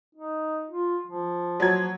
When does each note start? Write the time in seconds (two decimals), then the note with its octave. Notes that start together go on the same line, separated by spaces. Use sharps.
0.15 D#4
0.69 F4
1.07 F3
1.60 F#3 G#6